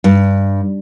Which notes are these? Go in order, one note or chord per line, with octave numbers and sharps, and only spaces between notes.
G2